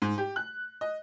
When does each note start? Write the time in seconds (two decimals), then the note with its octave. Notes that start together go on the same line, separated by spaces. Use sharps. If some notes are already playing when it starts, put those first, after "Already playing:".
0.02 G#2
0.18 G4
0.36 F#6
0.81 D#5